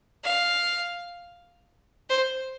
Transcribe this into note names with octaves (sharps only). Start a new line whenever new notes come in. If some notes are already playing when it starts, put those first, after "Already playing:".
F5
C5